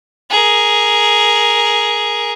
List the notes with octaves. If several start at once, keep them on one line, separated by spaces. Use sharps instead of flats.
G#4 A#4